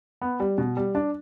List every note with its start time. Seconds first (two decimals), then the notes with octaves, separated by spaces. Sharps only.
0.22 B3
0.40 G3
0.58 B2
0.77 G3
0.95 D4